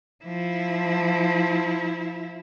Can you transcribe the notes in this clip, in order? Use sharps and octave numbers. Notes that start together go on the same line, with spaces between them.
F3 E4